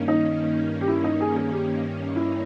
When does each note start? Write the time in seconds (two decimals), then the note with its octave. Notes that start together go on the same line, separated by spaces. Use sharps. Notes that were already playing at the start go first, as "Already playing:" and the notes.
Already playing: G2 D#3 A#3 C#4
0.08 D#4
0.81 G4
0.88 E4
1.04 D#4
1.21 G#4
1.36 G#4
1.52 G4
2.16 E4